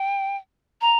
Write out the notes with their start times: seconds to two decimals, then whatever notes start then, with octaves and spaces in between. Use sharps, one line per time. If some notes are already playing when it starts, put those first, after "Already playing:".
Already playing: G5
0.81 A#5